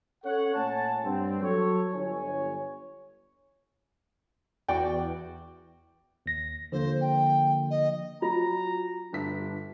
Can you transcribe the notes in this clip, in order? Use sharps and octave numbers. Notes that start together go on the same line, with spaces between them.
C#4 A4 C#5 F#5
A#2 A3 C#5 F#5 G#5 A5
G2 C4
F#3 A4 C#5
G1 C#5 G#5
E2 F#4 D5 G5
D#2 A#6
D3 F3 A#3 C5
G5
D#5
F#3 F4 A#5
G1 G2 D4 B6